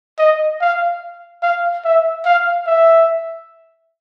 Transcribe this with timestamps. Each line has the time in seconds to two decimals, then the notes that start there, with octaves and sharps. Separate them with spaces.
0.19 D#5
0.61 F5
1.43 F5
1.85 E5
2.25 F5
2.66 E5